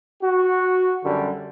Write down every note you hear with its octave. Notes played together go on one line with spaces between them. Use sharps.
F#4
F#2 D3 G3